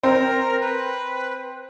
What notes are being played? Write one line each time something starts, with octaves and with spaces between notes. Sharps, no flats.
C4 A#4
B4